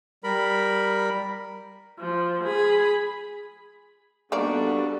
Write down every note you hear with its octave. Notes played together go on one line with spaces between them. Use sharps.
G3 A#4 B5
F3
G#4 B5
D#3 G3 A#3 B3 D4 F#4 A4 D5